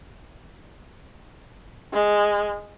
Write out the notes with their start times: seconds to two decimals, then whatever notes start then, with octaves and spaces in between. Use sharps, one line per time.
1.93 G#3